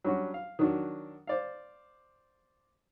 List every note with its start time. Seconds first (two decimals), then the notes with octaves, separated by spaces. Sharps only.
0.04 F#3 G3 C#4 D4 F#4
0.34 F5
0.59 D#3 F#3 D4 F#4
1.27 C5 D5 F5